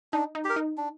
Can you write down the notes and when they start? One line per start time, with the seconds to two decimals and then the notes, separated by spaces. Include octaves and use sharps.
0.13 D4 D#4
0.35 D#4
0.44 G4 A#4
0.56 D#4
0.78 D4